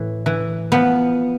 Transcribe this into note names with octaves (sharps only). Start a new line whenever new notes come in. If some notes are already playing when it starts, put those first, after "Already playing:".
Already playing: A2 E3
E3
F3 B3